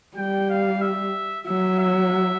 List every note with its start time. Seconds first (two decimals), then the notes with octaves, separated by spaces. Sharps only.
0.17 G3 G5
0.50 F5
0.81 E5
1.46 F#3 E5
1.79 E5